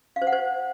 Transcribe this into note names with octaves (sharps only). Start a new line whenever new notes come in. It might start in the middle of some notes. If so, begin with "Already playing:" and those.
F5
C5
F#5
C5